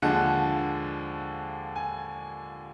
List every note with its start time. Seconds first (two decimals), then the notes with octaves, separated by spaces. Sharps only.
0.02 D#2 D3 F3 G#3 F#5
1.76 G#5